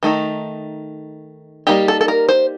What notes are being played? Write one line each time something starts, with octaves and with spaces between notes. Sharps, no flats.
D#3 A3 D#4
G3 A#3 D#4 G4
A4
A4
A#4
C5